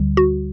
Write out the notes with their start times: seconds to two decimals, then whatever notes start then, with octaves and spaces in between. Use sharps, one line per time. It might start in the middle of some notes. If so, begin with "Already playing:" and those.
Already playing: D2 D3 G3
0.17 F#4